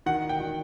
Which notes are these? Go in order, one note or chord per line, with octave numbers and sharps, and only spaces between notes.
D#3 F#5
G5
D#3